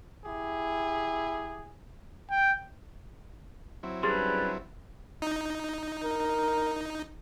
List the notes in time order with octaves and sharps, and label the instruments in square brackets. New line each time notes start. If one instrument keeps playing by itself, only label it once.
[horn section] E4 G4 G#4
[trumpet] G5
[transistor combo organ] F#3 C4 E4
[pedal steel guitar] G3 C#4 D4 [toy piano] G4 G#4 C6 [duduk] B4
[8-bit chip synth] D#4
[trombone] A#4